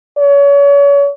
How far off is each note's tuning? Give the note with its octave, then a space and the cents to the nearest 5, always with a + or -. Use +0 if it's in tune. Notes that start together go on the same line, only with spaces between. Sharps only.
C#5 +35